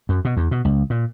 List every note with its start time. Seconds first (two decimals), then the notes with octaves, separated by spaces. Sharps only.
0.09 F#2
0.25 B2
0.37 E2
0.51 B2
0.65 C#2
0.90 A#2